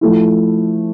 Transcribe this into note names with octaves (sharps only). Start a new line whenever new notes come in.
F3 A3 E4